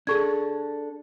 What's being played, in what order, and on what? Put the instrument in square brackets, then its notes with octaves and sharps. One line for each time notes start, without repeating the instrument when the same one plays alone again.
[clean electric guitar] D4 A4 [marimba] G#4 C#6 G#6